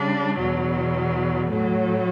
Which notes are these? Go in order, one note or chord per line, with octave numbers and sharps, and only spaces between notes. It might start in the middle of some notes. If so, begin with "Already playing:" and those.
Already playing: C#3 G3 D4
E2 B2 F#3
A2 F#3 A3